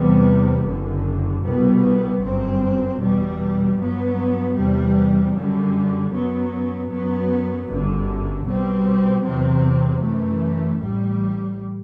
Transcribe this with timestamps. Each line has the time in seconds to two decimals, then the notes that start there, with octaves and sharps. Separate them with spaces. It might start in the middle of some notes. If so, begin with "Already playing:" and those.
Already playing: E2 C3 G3 B3
0.64 F#1 F#2 D3
1.42 C2 B2 G3 B3
2.20 G1 F#2 F#3 C4
2.98 E2 B2 G3
3.77 G2 F#3 B3
4.55 E2 C3 G3
5.33 F#2 D3 G3
6.10 F#2 F#3 B3
6.88 F#2 F#3 B3
7.66 G1 F#2 D3
8.44 B1 B2 G3 C4
9.22 E2 C3 F#3 C4
10.00 F#2 E3 A3
10.79 A1 A2 G3